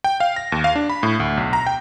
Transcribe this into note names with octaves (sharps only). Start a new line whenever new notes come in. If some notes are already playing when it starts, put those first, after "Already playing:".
G5
F5
A#6
D#2
F5
D4
B5
A2
D2
B1
A#5
G5